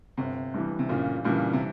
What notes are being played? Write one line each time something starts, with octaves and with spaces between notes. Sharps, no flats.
G1 C3
G2 E3
C3
G1 A#2 C#3
G2 A#2 C#3 E3
C3